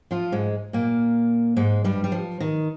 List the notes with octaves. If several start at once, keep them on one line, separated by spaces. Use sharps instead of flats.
F3 F4
G#2 G#3
A#2 A#3
G#2 G#3
G2 G3
G3
F3
D#3